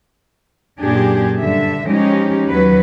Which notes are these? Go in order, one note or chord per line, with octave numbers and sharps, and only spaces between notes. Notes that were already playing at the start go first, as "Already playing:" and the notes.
F#2 A#2 D4 G4 G#4
G2 D3 E5
F3 G#3 C#4 D#4 G4
D#2 F#3 B4